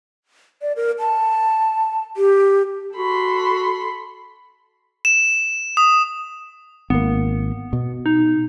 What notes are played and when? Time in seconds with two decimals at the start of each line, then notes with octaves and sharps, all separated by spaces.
0.62 D5
0.76 A#4
0.99 A5
2.17 G4
2.96 F#4 A4 B5 C6
5.05 E7
5.77 D#6
6.90 G#1 A#3 B3
7.73 B2
8.06 D#4